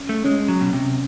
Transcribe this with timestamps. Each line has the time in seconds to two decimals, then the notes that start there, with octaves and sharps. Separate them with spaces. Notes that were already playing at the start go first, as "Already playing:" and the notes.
Already playing: C#4
0.09 A3
0.25 G#3 C#4
0.48 F#3
0.61 B2
0.73 C3